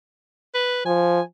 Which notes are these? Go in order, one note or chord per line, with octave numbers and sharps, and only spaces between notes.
B4
F3 G#5